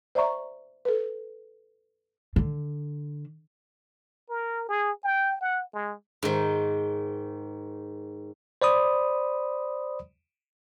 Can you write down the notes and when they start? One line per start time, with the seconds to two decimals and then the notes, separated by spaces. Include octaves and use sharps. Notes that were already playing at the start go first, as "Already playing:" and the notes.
0.15 C5 D5 E5 A#5 C#6
0.85 A4 B4
2.36 D3
4.30 A#4
4.69 G#4
5.04 G5
5.41 F#5
5.74 G#3
6.23 G#2 D#3
8.62 C5 D5 B5 D#6